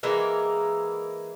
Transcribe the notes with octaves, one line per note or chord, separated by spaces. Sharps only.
E3 G#3 A#3 A#4